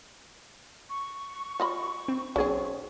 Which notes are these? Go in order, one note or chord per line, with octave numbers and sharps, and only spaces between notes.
C#6
F4 D#5 B5
C4
B1 C4 C#4 G#4